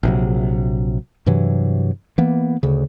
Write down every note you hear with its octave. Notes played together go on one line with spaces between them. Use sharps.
A#1 C3 F#3
G2 C3 E3 F#3
E3 A#3 B3
D2 C#3